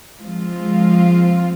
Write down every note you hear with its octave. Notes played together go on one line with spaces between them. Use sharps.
F3 G#3 C4 F4